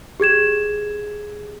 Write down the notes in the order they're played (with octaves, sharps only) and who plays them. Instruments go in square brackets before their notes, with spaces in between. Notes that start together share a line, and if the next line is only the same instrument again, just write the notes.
[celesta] G4 G#4 G#6 E7